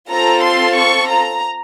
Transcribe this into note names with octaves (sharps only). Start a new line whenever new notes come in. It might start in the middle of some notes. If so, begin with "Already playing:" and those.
C4 F4 A4 A#5
C6
C#6
A#5